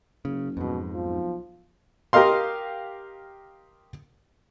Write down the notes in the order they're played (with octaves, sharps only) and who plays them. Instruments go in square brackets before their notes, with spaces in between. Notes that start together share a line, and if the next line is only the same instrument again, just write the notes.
[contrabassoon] F#1 [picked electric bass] C#3
[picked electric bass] F2 G#2 [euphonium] B2
[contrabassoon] B1 [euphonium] F3
[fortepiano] G4 A#4 D#5 F5 C6